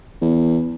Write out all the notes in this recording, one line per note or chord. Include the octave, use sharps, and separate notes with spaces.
E2